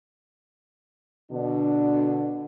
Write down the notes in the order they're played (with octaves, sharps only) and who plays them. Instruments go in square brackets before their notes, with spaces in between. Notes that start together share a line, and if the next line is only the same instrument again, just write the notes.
[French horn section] B2 D3 D4